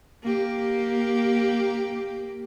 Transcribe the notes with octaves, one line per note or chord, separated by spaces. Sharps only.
A#3 G4